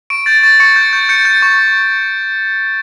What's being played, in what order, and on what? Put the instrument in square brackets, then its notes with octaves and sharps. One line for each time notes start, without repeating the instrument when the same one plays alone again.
[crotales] C#6 D7
G6 A6
C#6 A6
C#6 C#7
G6
G6
G6 C#7
G6
C#6